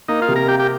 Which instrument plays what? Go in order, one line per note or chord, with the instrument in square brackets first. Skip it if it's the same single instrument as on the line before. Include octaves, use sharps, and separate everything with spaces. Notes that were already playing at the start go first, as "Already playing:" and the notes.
[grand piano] A#3 [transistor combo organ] D#4
[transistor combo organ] F4
[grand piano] C3
[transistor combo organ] A#4
[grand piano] A#3 [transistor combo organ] G4
[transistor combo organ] G4